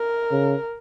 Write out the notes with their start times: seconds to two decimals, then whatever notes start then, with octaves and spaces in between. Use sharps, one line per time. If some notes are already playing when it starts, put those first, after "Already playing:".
Already playing: A#4
0.32 C#3